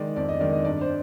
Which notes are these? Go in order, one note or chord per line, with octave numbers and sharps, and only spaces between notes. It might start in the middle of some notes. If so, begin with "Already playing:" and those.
Already playing: D#3 G#3 D5
F2 D5
D#5
D#3 G#3 D5
D#5
G2 D5
C5